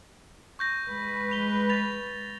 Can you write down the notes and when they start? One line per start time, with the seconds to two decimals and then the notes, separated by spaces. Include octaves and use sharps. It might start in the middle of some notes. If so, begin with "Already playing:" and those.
0.59 C#6 G6 A#6
0.88 G#3 B4
1.31 F7 G7
1.70 A6 F7